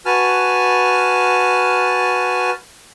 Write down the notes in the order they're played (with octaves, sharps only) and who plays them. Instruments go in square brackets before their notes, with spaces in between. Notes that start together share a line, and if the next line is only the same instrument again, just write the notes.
[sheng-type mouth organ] F#4 B4 G#5 A5 F6